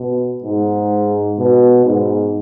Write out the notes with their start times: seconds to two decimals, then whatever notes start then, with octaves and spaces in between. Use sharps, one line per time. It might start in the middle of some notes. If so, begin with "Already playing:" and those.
Already playing: B2
0.44 G#2
1.39 B2
1.85 G#2